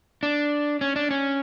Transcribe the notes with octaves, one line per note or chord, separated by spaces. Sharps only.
D4
C#4
D4
C#4